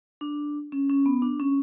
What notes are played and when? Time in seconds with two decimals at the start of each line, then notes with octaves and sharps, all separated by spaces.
0.21 D4
0.72 C#4
0.89 C#4
1.06 B3
1.22 D4
1.40 C#4